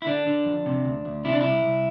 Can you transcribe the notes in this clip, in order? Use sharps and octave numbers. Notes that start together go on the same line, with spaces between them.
E4
D3 D4
D3
F2
C3
D2
D2
C3 E4
D4
C2 E4
C2